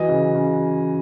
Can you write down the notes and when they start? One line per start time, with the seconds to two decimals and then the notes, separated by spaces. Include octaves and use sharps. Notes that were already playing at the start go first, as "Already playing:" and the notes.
Already playing: E3 F#3 D#5
0.08 C#3
0.35 C#3